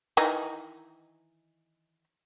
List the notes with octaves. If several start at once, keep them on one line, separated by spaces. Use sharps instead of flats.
D#3 E3 D#4